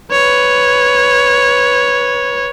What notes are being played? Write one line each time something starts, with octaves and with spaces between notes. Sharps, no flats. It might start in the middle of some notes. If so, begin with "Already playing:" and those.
B4 C#5